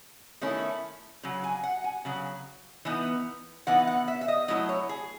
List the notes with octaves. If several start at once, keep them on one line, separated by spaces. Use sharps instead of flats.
D#3 A3 C#4 E4
C#3 F#3
G#5
F#5
G#5
C#3 F#3
E3 B3 D#4
E3 B3 D#4 F#5
F#5
E5
E5
D#5
F#3 A3 E4 D#5
C#5
G#4